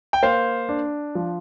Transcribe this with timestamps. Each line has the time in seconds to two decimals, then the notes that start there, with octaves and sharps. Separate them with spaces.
0.13 G5
0.23 A#3 C5 F5
0.69 D4
1.15 F3